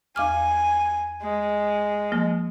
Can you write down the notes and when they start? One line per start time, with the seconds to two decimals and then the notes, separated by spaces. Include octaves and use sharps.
0.16 E2 G#5 D6 F6
1.22 G#3
2.12 F3 A#3